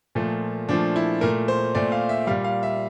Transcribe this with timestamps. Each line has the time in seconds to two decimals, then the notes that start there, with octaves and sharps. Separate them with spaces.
0.15 A#2 F3 A3
0.69 A#2 F3 A3 D4
0.96 E4
1.21 A#2 A3 A#4
1.48 C5
1.75 A#2 A3 D5
1.92 F5
2.09 E5
2.27 G3 F5
2.31 A#2
2.44 F5
2.63 E5